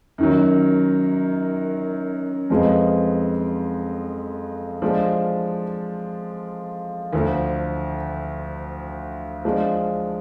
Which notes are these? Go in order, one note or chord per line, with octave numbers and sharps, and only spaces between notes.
F#2 D#3 F#3
F2 F3 G#3 B3
F3 G#3 D4
D2 D3 F3
F3 G#3 D4